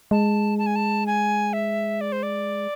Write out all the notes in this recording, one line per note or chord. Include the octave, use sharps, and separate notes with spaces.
G#3 A5
A5
G#5
A5
G#5
E5
D5
C5
D5